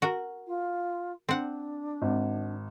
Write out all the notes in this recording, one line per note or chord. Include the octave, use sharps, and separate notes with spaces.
F#4 A#4
F4
C4 D4 F#5
G#1